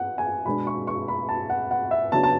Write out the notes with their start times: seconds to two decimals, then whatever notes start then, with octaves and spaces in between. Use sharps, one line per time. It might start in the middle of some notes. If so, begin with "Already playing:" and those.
Already playing: F#5
0.18 G#5
0.46 B2 G#3 D4 B5
0.67 C#6
0.87 C#6
1.08 B5
1.29 A5
1.50 F#5
1.71 F#5
1.91 E5
2.12 C#3 F#3 B3 D4 A5
2.23 A5